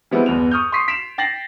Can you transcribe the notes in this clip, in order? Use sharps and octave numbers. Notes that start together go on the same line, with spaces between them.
E3 G3 G#3 B3 C4 E4
G1 E2 B3 F7
C#6 D#6 F6 G6
C6 C#6 D#6 B6 C7
C6 B6 D7 E7 F7
G5 A6 A#6 C7 F#7